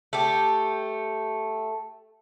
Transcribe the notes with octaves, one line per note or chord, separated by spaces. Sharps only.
A3 G4